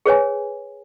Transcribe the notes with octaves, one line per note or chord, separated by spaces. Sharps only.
G#4 B4 C#5 G#5